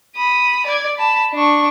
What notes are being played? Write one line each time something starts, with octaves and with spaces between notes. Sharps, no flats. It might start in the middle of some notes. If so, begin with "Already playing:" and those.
B5 D#6
D5 G#6
A5 B5
D4 C#6